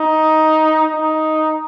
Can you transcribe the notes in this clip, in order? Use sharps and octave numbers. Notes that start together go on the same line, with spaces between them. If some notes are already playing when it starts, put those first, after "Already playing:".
Already playing: D#4
D#4